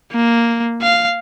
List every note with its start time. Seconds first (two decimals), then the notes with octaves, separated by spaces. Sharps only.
0.12 A#3
0.82 F5